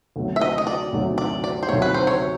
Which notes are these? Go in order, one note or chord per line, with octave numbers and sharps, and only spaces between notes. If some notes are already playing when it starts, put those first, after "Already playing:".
D2 C3 D#3 F#3 A3
E5
D#5
D#5
D5
D2 C3 D#3 F#3 A3
D5
D5
C5
D2 C3 D#3 F#3 A3 C#5
B4
C5
C#5